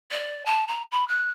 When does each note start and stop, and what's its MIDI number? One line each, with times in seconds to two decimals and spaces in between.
0.11 0.43 74
0.46 0.66 81
0.67 0.82 82
0.91 1.07 83
1.08 1.30 90